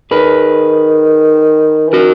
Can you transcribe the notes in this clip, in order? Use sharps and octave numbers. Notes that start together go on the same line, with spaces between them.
D#3 G#4 B4
E3
D#3 F#4 A#4